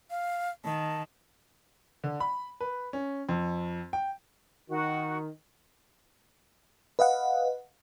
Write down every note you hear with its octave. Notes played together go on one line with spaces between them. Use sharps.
F5
D#3 A5
D3
B5
B4
C#4
F2
G5
D#3 F#4
B4 D#5 F5 F#5